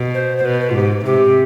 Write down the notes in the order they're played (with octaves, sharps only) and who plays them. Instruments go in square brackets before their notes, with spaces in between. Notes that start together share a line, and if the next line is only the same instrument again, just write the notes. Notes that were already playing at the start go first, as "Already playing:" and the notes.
Already playing: [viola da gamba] B2
[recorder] C5
C5
[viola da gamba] B2 [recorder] B4
[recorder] B4
F4
[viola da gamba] G#2 [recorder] G4
[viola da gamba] C3 [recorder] G4